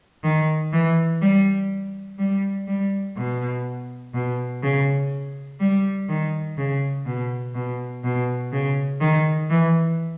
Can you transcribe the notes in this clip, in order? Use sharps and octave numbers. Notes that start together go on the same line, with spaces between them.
D#3
E3
G3
G3
G3
B2
B2
C#3
G3
D#3
C#3
B2
B2
B2
C#3
D#3
E3